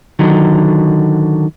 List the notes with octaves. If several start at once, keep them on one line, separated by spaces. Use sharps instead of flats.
D3 D#3 F#3